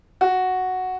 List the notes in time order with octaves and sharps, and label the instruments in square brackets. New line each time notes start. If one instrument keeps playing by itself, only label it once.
[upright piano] F#4